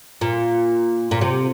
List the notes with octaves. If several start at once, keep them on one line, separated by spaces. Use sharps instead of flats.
A#2
A#2
C3